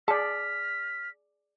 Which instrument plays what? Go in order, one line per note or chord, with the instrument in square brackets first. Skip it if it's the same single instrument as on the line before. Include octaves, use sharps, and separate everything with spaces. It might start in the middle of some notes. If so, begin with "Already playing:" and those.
[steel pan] G#4 D5 [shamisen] A5 [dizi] F6 [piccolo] B6